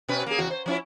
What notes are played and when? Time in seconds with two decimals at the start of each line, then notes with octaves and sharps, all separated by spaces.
0.09 B2 C#4 B4
0.26 A#3 G#4
0.38 E2 C#3 F#4
0.50 C5
0.66 F3 C#4 E4